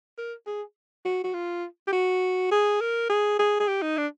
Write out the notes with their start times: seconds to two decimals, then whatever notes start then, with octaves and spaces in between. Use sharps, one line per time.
0.18 A#4
0.47 G#4
1.05 F#4
1.24 F#4
1.34 F4
1.87 G4
1.93 F#4
2.51 G#4
2.81 A#4
3.10 G#4
3.39 G#4
3.60 G#4
3.68 G4
3.82 D#4
3.97 D4